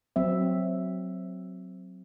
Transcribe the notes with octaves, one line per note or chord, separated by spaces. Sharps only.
F#3 C4 E5